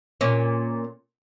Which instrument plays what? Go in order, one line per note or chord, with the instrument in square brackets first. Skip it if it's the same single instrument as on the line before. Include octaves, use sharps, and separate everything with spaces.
[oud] A#2 C#4